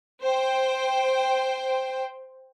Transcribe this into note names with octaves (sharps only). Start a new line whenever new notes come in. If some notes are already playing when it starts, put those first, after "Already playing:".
C5 G5